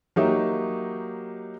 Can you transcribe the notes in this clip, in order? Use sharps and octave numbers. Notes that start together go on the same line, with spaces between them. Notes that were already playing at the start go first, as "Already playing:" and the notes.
F#3 A#3 D#4 G4 E5